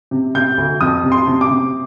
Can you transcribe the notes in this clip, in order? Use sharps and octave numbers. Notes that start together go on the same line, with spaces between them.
C3
C3 G6
D2
F2 D#6
C3
C6
C3
D6
C3